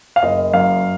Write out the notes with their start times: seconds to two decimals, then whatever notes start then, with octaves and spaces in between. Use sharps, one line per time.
0.16 F5
0.23 F#1 D#5
0.53 F#2 F5